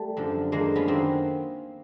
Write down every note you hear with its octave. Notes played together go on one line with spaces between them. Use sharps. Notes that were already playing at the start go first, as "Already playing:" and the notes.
Already playing: G3 A3
F#2 D3 F3
F#2 D3 F3 G#3 A#3
B3 C#4
F#2 D#3 F#3 A#3 C4